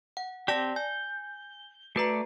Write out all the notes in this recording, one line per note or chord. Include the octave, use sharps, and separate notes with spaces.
F#5
C4 G4 D5 A5 A#6
G#5 G6
A3 F#4 B4 D5 A#5